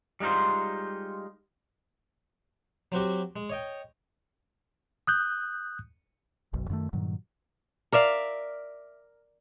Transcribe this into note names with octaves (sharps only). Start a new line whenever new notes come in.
G3 G#3 D#4 F4 C5
F#3 C4 F#4 G4
G#3
C#5 D#5 G5
D#6 F#6 G6
F#1 B1 F#2
F#2 D#3 F3 A3
G2 A#2 D#3 F#3
A#4 D5 E5 F5